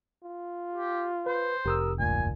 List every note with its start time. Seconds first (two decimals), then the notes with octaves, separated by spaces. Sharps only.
0.24 F4
0.73 G4
1.26 B4 C5
1.66 F1 G4 A#4 D#6 E6
1.99 A1 D2 G2 A#2 G#5